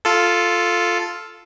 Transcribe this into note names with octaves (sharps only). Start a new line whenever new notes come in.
F4 A4